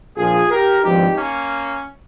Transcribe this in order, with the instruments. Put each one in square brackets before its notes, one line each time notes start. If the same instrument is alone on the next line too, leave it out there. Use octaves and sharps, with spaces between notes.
[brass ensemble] A#1 A#2 F3 F4 G#4
G4 A#4
G#1 G2 F3 D#4 G4
A#3 C#4